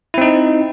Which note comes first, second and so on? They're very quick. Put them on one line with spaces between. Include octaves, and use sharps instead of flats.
E4 C4 D#4